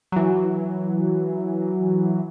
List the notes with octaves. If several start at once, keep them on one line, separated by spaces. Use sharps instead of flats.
E3 F#3